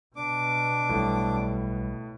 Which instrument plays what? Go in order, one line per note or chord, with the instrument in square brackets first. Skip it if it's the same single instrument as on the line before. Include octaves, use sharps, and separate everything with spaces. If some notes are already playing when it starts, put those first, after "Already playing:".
[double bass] B2 [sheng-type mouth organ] D4 D6
[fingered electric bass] B1 G3 [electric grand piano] A2